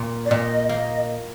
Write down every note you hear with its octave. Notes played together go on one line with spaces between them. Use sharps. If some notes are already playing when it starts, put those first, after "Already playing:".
Already playing: A#2
D5
A#2 D#5
A#3 D#5